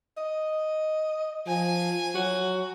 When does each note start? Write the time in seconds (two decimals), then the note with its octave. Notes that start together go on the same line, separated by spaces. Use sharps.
0.17 D#5
1.47 F3 G#5
2.15 F#3 F#4